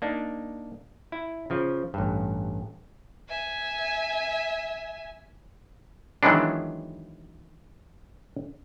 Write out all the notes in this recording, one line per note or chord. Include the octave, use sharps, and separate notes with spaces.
A#3 D4 D#4
E4
C#3 F3
A1 G2
E5 G#5
D#3 E3 F#3 G#3 B3 D4